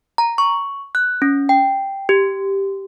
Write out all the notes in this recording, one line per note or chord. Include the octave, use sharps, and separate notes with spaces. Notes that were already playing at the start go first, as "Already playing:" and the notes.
A#5
C#6
F#6
C#4
G5
G4